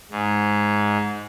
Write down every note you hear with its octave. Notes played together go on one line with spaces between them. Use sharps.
G#2